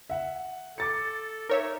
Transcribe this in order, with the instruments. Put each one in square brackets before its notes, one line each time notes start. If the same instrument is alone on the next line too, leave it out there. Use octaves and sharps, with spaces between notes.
[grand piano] E5 F#5
[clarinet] A4 [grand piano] D6 A6 C#7
[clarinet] D#4 [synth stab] A#4 C#5 E5